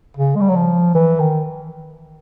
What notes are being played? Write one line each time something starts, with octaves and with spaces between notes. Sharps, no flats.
C#3
G#3
G3
F#3
F3
E3
D#3